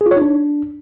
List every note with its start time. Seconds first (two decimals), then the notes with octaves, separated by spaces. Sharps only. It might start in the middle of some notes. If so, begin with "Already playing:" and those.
0.01 G#4
0.06 F4
0.11 C#5
0.16 D#4
0.22 D4